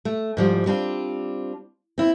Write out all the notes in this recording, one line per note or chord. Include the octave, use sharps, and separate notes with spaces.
A3
G#2 F3 G3
G3 C4 D4 F4
C4 E4